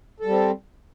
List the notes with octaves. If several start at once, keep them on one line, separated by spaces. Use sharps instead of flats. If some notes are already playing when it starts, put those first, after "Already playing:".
G3 C4 A4